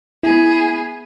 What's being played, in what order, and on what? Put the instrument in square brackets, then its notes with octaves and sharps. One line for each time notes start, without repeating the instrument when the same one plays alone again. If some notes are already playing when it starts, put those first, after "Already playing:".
[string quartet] B3 G#4 [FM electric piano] E4